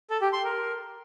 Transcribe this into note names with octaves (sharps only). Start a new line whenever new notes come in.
A4
G4
C6
A#4